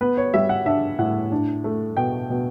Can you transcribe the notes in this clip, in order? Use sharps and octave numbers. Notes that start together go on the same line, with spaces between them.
B3 B4
C#5
G3 E5
F#5
D4 E5
A2 F#5
D4
A3
B2 G5
B2